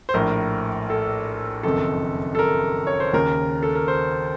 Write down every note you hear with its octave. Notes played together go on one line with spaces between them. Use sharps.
C5
A#1 A2 A#4
A4
F#1 F2 D#3 A4
A4
A#4
C#5
C5
D#2 C#3 A#4
A4
A#4
C5